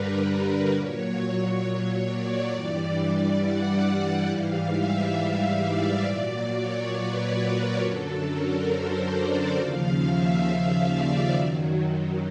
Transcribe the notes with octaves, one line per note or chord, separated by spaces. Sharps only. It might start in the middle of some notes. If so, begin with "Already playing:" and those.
Already playing: G2 D3 G3 A#4 B4
A#2 F#3 C#5
D5
G2 E3 G3 D5
F#5
G#2 E3 G3 F5
E5
D5
A#2 F#3 D5
C#5
B4
A#4
F#2 D3 F#3 A4
A#4
C5
D5
D#2 C#3 F3 F5
E5
D5
F#2 D#3 F#3